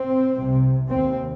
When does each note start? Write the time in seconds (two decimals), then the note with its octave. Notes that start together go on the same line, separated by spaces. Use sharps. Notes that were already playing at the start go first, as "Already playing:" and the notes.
Already playing: C4
0.33 C2 C3
0.89 D#2 C4